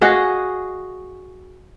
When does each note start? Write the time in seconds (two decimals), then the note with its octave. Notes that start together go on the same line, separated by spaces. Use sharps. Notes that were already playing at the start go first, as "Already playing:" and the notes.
0.01 F#4 G#4 D#5 F5